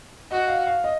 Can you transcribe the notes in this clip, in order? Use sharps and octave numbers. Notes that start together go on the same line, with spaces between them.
F#4 D#5
F5
F5
D#5